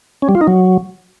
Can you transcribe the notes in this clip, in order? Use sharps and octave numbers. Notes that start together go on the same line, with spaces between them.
C#4
G3
F4
D#4
F#3